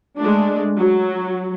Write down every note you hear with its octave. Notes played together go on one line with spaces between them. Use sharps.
G#3 A3 D4
F#3